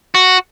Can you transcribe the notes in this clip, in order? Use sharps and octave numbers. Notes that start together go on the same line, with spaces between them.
F#4